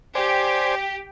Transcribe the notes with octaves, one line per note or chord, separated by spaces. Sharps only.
G4 C5 D5 G#5